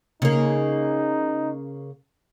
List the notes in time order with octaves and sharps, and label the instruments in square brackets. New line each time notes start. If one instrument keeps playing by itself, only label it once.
[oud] C#3 A#3 [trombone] D#4